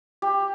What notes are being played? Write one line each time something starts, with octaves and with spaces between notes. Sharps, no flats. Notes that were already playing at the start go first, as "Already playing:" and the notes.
G4